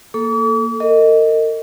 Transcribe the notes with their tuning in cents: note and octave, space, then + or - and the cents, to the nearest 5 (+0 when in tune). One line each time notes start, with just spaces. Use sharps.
A#3 +0 A4 +0 D6 -45
A#4 -40 D#5 +5